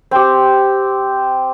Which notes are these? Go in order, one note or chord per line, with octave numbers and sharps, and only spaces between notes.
C4 G4